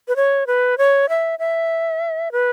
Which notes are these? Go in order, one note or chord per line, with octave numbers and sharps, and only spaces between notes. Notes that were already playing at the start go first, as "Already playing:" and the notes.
B4
C#5
B4
C#5
E5
E5
B4